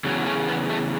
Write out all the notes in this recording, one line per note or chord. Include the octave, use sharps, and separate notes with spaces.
E2 C#3 F#3
A3 C#4
B3
A3